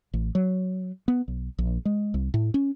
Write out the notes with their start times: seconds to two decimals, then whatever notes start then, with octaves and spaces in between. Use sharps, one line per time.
0.13 A1
0.35 F#3
1.08 B3
1.28 B1
1.58 A#1
1.85 G#3
2.14 C2
2.34 A2
2.54 C#4